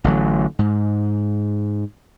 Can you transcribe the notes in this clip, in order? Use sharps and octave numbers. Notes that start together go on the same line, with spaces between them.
A1 D3 F#3
G#2